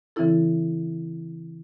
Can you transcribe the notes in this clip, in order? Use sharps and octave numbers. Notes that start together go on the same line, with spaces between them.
C#3 E3 C4 E4 A4